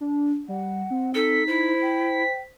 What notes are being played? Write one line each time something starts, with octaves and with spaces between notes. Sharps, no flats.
D4
G3 F#5
C4
D#4 A4 B6
E4 C5
G5